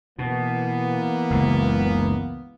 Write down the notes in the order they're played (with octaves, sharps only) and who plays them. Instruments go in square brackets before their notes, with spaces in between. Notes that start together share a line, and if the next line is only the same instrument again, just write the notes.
[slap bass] B2 [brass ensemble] E3 A#3 B3
[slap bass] F#1 C#2